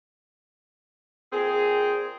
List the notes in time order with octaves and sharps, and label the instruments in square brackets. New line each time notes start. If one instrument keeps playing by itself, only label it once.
[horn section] A#2 C4 G#4